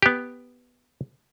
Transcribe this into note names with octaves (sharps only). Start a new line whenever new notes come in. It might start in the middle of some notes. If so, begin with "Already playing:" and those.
B3 G4